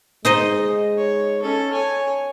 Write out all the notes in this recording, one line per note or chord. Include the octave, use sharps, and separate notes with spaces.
G#3 D#4 C5 D#5
C#5
C#4 A4
C#5 G#5